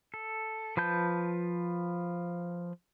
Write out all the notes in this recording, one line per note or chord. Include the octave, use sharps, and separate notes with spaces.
A4
F3 B4 A5 G6